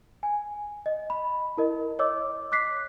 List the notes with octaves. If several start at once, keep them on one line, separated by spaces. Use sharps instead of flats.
G#5
D#5
B5
E4 A#4 D#5
C#5 D#5 D6 E6
D6 F#6 B6 C7